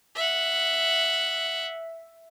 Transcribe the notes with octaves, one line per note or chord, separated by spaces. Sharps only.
E5 F#5